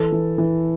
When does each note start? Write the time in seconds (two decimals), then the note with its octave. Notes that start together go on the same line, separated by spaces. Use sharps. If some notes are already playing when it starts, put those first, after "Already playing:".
Already playing: E3 A4
0.12 E3
0.38 E3